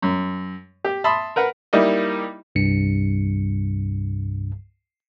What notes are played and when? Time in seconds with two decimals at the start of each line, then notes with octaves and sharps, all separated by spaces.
0.02 F#2
0.84 G4
1.04 E5 A5 B5 C6 D#6
1.36 A#4 B4 F#5
1.73 G3 A#3 D#4 E4 D#5
2.55 C2 G2 C#7